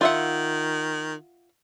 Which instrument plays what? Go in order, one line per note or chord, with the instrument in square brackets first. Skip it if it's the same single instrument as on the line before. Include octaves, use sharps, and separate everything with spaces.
[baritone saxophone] D#3 [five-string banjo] F4 E5 F#5